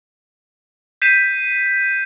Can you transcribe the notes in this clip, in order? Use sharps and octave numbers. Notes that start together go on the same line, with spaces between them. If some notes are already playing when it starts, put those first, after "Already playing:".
G6 B6 C7 D#7 E7